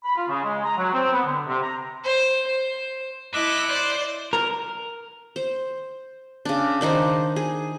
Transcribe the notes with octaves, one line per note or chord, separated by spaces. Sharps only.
B5
F4
C#3
G#3
A#5
F#3
C4
B3
D3
C3
A#5
C5
C5
A3 E4 D#5 E5 D6 F#6
C5 D5
A#4
C5
C#3 D4
D#3 D4 D#4 C5
G#4